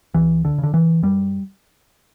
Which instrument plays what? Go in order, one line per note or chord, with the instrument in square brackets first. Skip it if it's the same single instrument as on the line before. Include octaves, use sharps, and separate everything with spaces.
[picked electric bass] C#2 E3
D3
C#3
D3
E3
F#2 G3